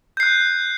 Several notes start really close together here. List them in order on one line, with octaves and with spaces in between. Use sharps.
G6 C7 F#6